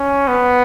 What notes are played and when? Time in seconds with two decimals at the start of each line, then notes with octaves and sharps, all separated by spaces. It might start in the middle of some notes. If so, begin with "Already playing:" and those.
Already playing: C#4
0.28 B3